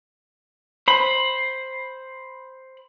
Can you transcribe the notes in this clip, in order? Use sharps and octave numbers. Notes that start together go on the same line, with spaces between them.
C5 B5